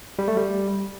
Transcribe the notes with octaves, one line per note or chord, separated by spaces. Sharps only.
G3
A3
G3